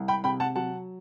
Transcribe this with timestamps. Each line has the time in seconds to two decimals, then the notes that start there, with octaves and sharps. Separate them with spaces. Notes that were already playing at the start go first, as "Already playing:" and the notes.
Already playing: C2
0.08 G5 B5
0.24 C3 G5 B5
0.40 F#5 A5
0.56 F#3 F#5 A5